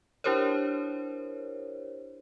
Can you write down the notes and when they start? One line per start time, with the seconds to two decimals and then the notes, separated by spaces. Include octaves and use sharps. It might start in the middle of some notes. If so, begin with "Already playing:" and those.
0.24 D4 E4 G4 A#4 C5 C#5